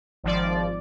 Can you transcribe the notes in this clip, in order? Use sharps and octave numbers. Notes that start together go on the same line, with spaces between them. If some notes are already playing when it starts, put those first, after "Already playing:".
G#1 F3 D5